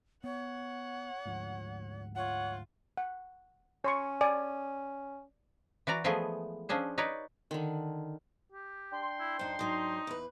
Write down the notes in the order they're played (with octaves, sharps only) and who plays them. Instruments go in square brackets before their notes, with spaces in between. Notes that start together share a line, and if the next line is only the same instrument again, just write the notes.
[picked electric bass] B3 [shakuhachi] C#5 [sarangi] F#5
[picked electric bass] D2 G#2 F3
[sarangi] F4 [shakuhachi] C#5 [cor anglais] F#5
[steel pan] F#5
[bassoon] C#4 [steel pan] C#5 C6 C#6
[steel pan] D5 G#5
[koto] E3 F#4 D5 A#5
E3 F3 G#3 A3 B3 G#4
F3 C#4 D4 G#4 C5
D#4 B4 C#5 D5
[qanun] D3 D#3
[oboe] G4
[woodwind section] D4 G5 C6
[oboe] E4
[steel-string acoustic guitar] F#2 D#4 [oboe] C5
[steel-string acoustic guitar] G#2 F#3 [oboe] D#4
[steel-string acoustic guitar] E2 B4